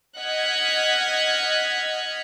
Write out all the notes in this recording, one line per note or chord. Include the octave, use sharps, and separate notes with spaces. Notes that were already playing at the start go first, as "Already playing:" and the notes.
D#5 F#5 F6 F#6 G#6 B6